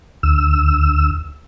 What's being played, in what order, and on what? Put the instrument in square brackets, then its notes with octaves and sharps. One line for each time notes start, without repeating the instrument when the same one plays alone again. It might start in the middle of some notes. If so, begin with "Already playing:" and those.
[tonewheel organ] D2 E6